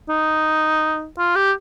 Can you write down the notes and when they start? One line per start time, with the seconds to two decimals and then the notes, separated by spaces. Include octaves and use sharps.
0.09 D#4
1.18 F4
1.36 G4